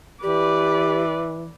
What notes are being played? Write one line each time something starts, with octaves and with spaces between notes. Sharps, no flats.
E3 G4 B4 D5